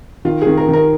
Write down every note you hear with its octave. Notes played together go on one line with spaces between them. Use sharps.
D#3 F4
G#4
D#3
A#4
D#3 A#4